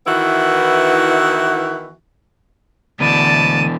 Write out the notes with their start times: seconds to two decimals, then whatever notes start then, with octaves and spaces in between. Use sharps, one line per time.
0.07 D#3 E3 B3 E4 F#4
3.00 D2 B2 E3 D5 A5 D#7